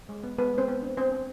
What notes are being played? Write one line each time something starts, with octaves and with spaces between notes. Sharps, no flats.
G#3
B3
G#3 B3 B4
G#3 C4 C5
B3
D4
C4 C5
C4